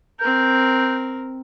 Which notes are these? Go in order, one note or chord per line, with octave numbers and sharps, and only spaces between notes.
C4 A#4 G6